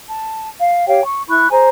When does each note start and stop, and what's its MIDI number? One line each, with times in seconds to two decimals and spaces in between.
0.08 0.49 81
0.59 0.85 77
0.87 1.00 67
0.87 1.00 73
0.87 1.00 77
0.87 1.00 79
1.05 1.22 85
1.28 1.47 64
1.28 1.47 83
1.28 1.47 85
1.28 1.47 90
1.50 1.69 68
1.50 1.69 72
1.50 1.69 80
1.50 1.69 82